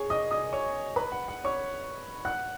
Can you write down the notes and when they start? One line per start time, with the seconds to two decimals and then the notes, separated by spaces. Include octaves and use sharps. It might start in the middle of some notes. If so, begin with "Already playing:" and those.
Already playing: G#4 C#5 G#5 C#6
0.10 D#5 D#6
0.31 D#5 D#6
0.53 C#5 C#6
0.96 B4 B5
1.12 F#5
1.28 F#5
1.44 C#5 C#6
2.25 F#5 F#6